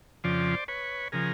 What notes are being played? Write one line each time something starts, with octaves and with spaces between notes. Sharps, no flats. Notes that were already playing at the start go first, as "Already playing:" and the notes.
F2 C#3 F3 C5 D5
B4 C#5
C#3 F3 G#4 A#4